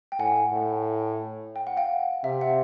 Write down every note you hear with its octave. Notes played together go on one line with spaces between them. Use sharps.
G5
A2 F#5 G#5
A2
G5
F#5
F5 G5
C3 E5
F#5